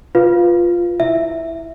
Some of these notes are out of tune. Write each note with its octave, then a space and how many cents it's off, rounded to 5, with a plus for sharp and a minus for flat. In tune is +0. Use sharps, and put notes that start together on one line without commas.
F4 +0 B4 +0 F5 +0
E4 +0 E5 +0